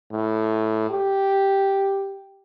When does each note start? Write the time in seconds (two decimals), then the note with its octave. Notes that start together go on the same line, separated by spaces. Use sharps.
0.12 A2
0.90 G4